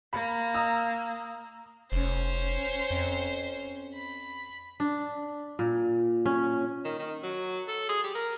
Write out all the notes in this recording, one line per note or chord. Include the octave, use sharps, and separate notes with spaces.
A#3 B5
A#5 D#6 E6
F1 C#4 C5
F2
B5
D4
A#2
C#4
D#3
D#3
F#3
A4
G#4
G4
A#4